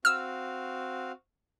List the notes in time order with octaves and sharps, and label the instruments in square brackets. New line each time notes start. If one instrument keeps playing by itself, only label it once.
[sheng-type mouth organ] C4 F#4 F5 [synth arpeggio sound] E6 F6